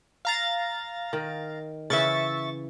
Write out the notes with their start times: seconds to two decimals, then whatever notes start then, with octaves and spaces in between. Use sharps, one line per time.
0.25 F5 A#5 A6
1.13 D#3
1.90 C#3 E3 E5 C#6 A6